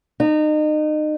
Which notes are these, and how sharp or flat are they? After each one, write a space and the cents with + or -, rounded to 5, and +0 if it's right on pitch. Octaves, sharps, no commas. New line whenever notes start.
D#4 -30